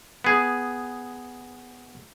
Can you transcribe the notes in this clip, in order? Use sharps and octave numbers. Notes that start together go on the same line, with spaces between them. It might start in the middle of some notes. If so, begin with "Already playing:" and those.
B3 G#4